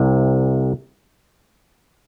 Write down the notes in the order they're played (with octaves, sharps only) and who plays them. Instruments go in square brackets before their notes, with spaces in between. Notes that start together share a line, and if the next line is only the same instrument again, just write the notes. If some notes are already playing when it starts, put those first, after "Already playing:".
Already playing: [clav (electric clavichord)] C2 C3